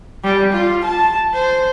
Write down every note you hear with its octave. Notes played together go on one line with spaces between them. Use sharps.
G3
F4
A5
C5